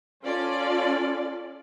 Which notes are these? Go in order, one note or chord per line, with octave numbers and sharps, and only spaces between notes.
C#4 F4 A4 D5